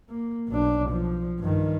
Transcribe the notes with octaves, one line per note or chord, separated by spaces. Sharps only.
A#3
B1 D4
F3
G2 D#3